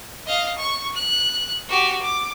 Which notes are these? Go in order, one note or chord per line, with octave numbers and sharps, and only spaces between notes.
D#5 F5
C#6
F#6
F#4 G4
D6